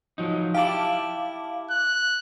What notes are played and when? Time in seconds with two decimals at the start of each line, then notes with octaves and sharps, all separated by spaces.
0.18 F3 F#3 D#4
0.54 E4 G4 F5 A5 D6
1.71 F#6